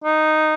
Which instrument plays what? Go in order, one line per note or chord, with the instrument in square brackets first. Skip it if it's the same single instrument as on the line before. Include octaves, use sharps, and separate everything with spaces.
[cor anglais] D#4